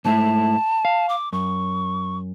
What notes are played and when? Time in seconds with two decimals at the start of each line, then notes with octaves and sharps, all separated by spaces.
0.05 G#2 A3 E4 A5
0.85 F5
1.09 D6
1.33 F#2 C#6